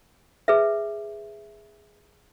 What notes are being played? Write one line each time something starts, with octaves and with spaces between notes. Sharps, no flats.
G#4 B4 E5